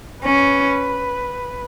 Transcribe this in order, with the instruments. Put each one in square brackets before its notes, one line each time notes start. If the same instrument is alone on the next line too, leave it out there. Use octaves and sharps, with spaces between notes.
[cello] C#4 [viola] B4